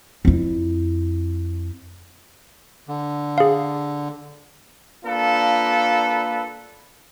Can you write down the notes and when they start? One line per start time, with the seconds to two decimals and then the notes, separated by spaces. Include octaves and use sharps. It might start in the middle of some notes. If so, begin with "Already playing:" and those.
0.25 F2 E4
2.88 D3
3.38 G#4 F5
5.04 A#3 D4 F4 A4 B4